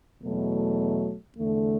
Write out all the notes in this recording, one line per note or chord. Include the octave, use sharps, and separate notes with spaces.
E2 B2 F#3 A3
E2 D3 A3